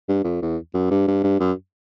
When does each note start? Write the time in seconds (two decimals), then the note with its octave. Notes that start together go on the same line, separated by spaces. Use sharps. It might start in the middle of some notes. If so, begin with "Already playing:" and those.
0.09 G2
0.24 F2
0.42 E2
0.74 F#2
0.91 G2
1.08 G2
1.24 G2
1.40 F#2